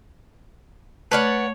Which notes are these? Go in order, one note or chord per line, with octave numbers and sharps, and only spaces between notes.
A3 B4 C#5 D5 F#5 F6 G#6